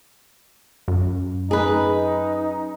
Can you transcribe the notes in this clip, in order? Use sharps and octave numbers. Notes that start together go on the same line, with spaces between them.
F#2
D#4 G#4 B4